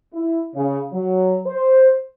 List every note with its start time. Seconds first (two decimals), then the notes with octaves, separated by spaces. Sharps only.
0.14 E4
0.55 C#3
0.93 F#3
1.46 C5